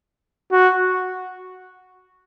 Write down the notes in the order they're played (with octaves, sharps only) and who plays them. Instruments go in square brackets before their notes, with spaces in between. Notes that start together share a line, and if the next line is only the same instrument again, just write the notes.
[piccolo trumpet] F#4